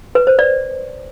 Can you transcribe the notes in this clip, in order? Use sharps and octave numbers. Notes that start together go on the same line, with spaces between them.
B4
C5
D5